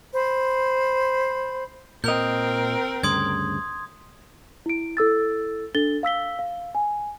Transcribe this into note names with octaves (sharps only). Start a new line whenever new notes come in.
C5 B5
A#2 C4 A#4 D#5 G6 F7
D2 G2 C#3 C6 D#6 G#6
E4 D7
E4 A4 E6 A6
D4 A4 A6 G7
F5 E6 B6 G7
F5
G#5